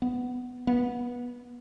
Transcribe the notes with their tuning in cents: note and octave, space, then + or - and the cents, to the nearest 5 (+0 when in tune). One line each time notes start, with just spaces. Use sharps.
B3 +10
B3 -20